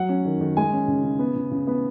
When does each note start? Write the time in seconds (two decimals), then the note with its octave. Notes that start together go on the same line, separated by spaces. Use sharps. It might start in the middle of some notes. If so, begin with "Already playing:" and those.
Already playing: F#3 F#5
0.09 C#4
0.25 D#3
0.40 D#3
0.57 G#3 G#5
0.72 C#4
0.88 C#3
1.04 C#3
1.19 B3
1.36 C#3
1.51 C#3
1.67 B3